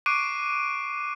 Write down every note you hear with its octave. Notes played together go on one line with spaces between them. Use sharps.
C#6 D6 F#6 C7 D7 D#7